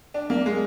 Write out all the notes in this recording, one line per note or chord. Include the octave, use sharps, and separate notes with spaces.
D4
A#3
G#3